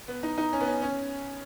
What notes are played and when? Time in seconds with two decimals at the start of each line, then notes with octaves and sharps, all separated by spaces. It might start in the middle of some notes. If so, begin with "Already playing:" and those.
0.08 B3
0.23 D#4
0.38 D#4
0.53 C#4
0.61 B3
0.67 C#4
0.82 C#4